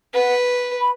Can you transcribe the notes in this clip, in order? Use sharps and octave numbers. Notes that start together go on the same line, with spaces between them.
B4 F#5
B5